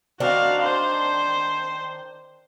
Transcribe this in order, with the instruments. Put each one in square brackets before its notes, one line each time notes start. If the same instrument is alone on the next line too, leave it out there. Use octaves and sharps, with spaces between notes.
[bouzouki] D#3 C4 D4 [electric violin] F#4 F5
[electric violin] C5